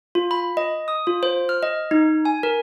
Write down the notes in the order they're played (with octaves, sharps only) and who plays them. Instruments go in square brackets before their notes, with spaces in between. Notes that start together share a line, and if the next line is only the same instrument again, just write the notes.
[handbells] F4
B5
D#5
D#6
F4
C5
F6
D#5
D#4
G#5
A#4